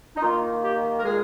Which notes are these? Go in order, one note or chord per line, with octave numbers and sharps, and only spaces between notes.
D#4
D#3 A#3 F4
G4
A#4
A#2 G#3 G#4